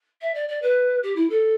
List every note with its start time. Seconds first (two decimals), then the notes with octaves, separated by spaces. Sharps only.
0.21 E5
0.34 D5
0.48 D5
0.62 B4
1.03 G4
1.15 E4
1.29 A4